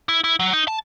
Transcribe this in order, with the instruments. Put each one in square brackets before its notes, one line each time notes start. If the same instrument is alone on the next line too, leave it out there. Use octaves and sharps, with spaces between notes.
[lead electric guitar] E4
E4
F#3
D#4
A5